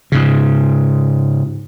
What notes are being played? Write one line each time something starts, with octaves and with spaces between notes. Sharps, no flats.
G#2 C#3